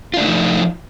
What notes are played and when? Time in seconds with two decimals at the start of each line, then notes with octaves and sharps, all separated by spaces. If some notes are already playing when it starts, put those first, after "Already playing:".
0.14 F4
0.17 D4
0.21 A3
0.24 D#4
0.28 F3